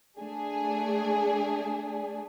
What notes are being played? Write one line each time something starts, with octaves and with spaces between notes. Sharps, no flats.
A3 D4 G#4